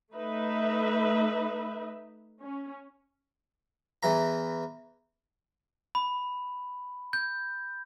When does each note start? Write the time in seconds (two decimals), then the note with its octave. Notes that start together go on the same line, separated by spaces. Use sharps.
0.13 A3 D#4 B4 E5
2.40 C#4
4.03 E2 E3 A#5
5.95 B5
7.13 G6